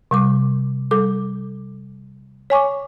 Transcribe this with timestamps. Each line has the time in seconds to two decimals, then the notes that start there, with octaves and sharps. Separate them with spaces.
0.11 C3 G3 D6
0.91 G3 A4 D6
2.50 C#5 G#5 C#6 D6